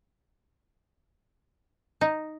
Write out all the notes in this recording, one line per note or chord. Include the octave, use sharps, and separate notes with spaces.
D#4